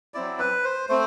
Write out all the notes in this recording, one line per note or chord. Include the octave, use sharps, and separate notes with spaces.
F#3 C4 E4 D5
B4
C5
A3 C4 C5